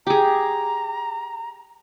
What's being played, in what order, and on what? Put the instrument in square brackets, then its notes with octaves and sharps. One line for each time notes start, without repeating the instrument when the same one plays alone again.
[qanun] G4 G#4 [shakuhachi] A#5